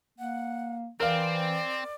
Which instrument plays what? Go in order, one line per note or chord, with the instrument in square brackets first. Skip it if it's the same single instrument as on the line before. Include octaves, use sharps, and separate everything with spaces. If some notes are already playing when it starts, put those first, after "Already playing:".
[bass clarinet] A#3 [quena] F#5
[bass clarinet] E3 [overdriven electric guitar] C4 [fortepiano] A#4 F5 [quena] D5